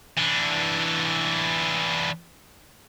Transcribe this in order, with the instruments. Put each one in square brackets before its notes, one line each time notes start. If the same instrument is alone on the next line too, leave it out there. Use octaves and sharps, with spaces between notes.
[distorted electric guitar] E3 D4